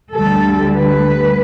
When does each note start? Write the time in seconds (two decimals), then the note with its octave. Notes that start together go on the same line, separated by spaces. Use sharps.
0.14 D2 D3 G3 A4
0.76 B4